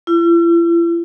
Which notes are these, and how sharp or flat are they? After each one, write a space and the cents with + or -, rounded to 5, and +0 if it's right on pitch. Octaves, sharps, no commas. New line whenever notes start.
E4 +45